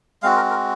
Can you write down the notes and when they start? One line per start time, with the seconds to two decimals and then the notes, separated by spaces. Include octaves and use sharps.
0.23 G#3 C4 F#4 F5
0.36 A#4
0.50 A#4